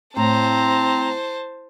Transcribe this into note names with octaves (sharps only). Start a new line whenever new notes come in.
A2 C4 C5 A5 A#5